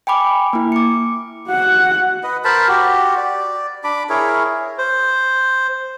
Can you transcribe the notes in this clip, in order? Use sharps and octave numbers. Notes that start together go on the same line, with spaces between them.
G5 G#5 B5 D6
A#3 E4
D6 C#7
F#4 F#5
B4 D#5
A#4 C5 A5 B5
F#4 G4
D5
D4 B5 D6
E4 G#4 A#4 C#5
C5